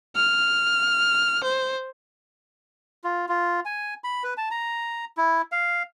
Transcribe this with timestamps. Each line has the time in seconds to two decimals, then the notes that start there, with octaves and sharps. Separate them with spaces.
0.16 F6
1.43 C5
3.04 F4
3.29 F4
3.65 G#5
4.04 B5
4.24 B4
4.37 A5
4.51 A#5
5.17 E4
5.52 F5